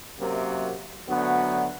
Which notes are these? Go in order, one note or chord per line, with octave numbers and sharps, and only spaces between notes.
F#2 C3 F#3 A#3
D2 D3 F#3 B3